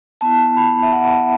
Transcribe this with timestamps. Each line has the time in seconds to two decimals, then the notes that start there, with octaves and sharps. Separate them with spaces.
0.21 B3 E4 A5
0.57 B5
0.83 E5
0.93 F#5